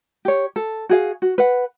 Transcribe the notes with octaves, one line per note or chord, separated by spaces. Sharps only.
G4 C#5
A4
F#4 G#4 F5
F#4
B4 F#5